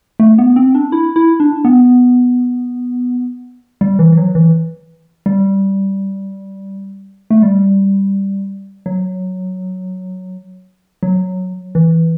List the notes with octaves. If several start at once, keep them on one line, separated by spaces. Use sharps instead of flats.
A3
B3
C4
D4
E4
E4
D4
B3
G3
E3
E3
F#3
E3
G3
A3
G3
F#3
F#3
E3